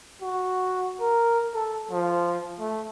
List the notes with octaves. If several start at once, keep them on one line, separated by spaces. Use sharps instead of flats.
F#4
A#4
A4
F3
A3